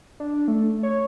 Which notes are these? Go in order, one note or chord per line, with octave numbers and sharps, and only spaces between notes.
D4
A3
C#5